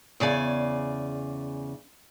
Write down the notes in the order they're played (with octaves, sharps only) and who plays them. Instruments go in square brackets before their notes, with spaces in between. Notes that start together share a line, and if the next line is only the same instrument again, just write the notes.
[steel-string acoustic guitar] E2 C#3 D5 G#5